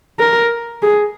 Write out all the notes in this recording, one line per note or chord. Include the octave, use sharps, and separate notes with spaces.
A#4
G#4